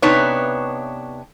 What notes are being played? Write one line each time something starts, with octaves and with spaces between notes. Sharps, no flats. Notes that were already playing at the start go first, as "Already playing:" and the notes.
C3 B3 D4 D#4 B4 C#5